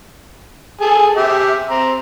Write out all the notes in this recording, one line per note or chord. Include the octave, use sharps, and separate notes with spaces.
G#4 A4
G4 E5
C4 A#5